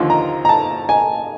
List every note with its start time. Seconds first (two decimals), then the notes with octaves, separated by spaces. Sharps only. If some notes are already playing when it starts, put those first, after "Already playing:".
Already playing: D#2 D3 F3 A#3 C6
0.10 A#5
0.45 A#5
0.49 A5
0.89 G#5